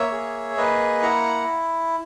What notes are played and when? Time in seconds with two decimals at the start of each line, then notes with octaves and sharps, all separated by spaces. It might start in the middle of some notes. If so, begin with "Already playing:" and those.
Already playing: A#3 C#5 E5
0.12 G#4
0.57 A#3 B4 D#5
1.02 E4 F#5 A#5